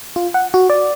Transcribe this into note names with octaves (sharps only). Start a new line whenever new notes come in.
F4
F#5
F#4
D5